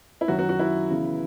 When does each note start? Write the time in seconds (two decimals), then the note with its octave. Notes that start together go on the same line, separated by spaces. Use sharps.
0.21 E4
0.28 F#2 D#3 F#3 F#4
0.39 F#4
0.49 F#4
0.59 E4
0.90 C#3 E3 B3